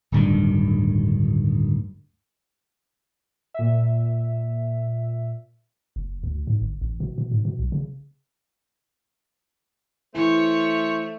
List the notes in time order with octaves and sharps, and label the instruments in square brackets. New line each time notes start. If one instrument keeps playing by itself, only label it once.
[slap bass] D1 D2 G2 D#3
[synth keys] A#2 E5
[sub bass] F#1
D2
G#2
G1
A1
B2
B2
G#2
B2
B1
C#3
[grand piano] E3 [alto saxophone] A3 [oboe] C5 [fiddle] C#5